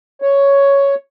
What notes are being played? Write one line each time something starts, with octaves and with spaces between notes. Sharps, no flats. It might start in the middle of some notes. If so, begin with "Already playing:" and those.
C#5